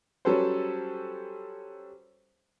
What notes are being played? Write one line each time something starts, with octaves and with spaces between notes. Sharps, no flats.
F#3 G3 C#4 A4 B4 C5